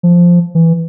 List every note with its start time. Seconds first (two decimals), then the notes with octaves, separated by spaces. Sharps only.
0.03 F3
0.55 E3